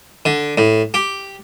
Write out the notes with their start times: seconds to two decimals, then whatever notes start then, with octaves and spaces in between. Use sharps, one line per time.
0.25 D3
0.58 A2
0.94 G4